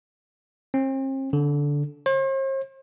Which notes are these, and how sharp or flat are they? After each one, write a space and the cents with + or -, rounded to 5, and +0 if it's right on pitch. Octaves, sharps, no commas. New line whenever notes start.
C4 +40
D3 -15
C5 +45